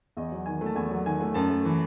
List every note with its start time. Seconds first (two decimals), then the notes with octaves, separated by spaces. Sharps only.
0.17 E2 D#5
0.32 F#3
0.46 D#3 G#5
0.61 A3
0.66 A5
0.75 E2 G#5
0.91 F#3
1.06 D#3 G#5
1.21 A3
1.34 F#2 A5
1.50 A3
1.65 E3